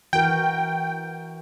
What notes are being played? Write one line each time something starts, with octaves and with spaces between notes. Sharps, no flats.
E3 F#4 A#4 G5